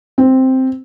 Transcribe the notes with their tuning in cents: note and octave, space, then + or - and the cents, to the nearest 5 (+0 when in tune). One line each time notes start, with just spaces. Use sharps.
C4 +0